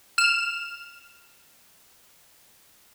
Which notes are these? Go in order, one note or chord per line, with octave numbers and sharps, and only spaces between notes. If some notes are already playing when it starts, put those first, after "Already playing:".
F6 E7